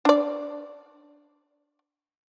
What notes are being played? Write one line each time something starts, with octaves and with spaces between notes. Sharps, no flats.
D4 D5